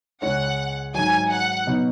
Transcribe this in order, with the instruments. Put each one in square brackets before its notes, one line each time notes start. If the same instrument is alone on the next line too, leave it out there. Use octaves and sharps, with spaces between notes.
[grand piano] C#2 C#3 G#3 C#4 [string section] F#5
[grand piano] G#2 D#3 F#3 [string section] G#5
[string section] F#5
[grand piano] B2 F#3 B3 D#4